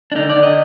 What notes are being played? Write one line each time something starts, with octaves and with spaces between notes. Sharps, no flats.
D4
D3 D#4
D5
D3
D#5